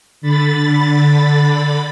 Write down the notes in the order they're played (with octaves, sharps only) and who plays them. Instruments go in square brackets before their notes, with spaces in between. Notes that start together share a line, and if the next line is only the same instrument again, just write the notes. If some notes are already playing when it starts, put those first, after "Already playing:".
[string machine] D3 B5 A6